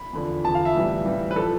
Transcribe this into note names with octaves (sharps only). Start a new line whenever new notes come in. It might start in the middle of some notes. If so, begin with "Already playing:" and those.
Already playing: B5
E2 D3 F3
E2 D3 F3 A5
F5
E5
A2 E3 G3
A2 E3 G3
B4
F3 A4